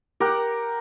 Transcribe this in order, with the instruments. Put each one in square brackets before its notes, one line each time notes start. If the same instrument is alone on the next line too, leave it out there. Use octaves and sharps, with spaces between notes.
[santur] G4 A#4 F#5